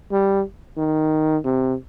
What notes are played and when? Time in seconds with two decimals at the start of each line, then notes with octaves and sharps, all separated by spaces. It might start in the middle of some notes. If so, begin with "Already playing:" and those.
0.12 G3
0.78 D#3
1.44 C3